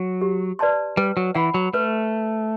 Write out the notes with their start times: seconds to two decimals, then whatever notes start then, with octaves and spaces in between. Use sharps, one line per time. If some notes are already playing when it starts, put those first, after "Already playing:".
Already playing: F#3
0.21 G4
0.59 B4 D5 A5 C6
0.97 G3 B4
1.17 F#3
1.35 E3 F#5 B5
1.54 F#3
1.73 A3 B4